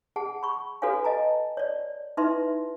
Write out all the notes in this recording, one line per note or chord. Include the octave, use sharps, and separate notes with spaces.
G#4 F#5 A5
B5 C#6
F#4 A4 B4 C#5 F5 G#5
D#5 A5 A#5
C#5 D5
D#4 E4 B4 E5 C6